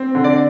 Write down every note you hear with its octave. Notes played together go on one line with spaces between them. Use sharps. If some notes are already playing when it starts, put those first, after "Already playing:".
Already playing: C4
D3
D5